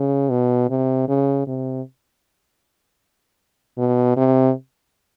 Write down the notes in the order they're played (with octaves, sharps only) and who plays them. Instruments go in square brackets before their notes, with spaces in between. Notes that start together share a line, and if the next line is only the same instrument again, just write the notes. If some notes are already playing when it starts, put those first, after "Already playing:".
Already playing: [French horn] C#3
B2
C3
C#3
C3
B2
C3